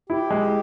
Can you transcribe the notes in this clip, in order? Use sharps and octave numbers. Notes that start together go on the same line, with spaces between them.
E4 G4
G#3